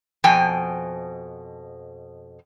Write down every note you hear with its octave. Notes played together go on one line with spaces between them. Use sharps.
F2 B2 F3 G5 G#5